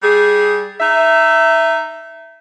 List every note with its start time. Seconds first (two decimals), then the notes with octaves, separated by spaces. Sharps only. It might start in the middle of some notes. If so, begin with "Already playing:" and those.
0.03 G3 G#4
0.80 D#4 E5